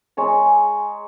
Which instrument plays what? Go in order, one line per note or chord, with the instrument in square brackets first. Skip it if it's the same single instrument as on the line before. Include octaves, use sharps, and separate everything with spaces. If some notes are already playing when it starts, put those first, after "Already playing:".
[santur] G#3 C#5 A#5